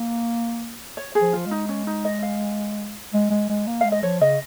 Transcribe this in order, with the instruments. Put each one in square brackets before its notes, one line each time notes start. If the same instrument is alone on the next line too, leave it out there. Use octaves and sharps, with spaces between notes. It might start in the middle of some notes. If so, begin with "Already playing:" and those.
Already playing: [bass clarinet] A#3
[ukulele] C#5
G#4
[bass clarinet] F3
[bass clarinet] F3 [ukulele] F4
[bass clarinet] G#3
[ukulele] D#4
C#4
D#4
D#5
F5
[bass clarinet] G#3
G#3
G#3
A#3
[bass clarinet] G#3 [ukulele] F5
[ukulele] D#5
[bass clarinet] F3 [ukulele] C#5
[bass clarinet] C#3 [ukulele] D#5